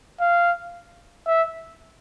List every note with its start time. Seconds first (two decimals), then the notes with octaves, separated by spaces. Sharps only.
0.20 F5
1.27 E5